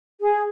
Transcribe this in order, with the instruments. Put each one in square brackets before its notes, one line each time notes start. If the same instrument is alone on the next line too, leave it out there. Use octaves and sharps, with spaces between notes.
[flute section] G#4